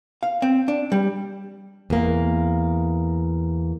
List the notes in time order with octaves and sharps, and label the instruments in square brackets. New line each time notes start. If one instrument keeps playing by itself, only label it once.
[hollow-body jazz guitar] F5
C4
D4
G3
[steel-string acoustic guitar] E2 A#3